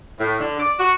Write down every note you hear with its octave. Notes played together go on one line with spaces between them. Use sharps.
A2
D3
D5
F#4